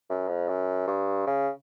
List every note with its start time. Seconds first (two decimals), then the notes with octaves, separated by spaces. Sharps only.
0.10 F#2
0.28 F2
0.48 F#2
0.87 G2
1.27 C#3